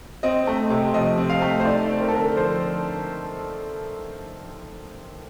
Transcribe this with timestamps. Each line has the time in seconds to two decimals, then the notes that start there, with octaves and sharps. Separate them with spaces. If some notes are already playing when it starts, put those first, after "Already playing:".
0.23 C4 D#5
0.47 A3
0.70 C3
0.94 F3 D#5
1.18 C4
1.30 F5
1.42 A3
1.60 C5
1.65 D#4 D5
1.90 C4
2.00 A#4
2.08 A4
2.12 D3 A#4
2.36 F3 C5